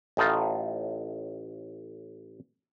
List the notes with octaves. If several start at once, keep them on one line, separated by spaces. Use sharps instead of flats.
A1 A2 D#4 F4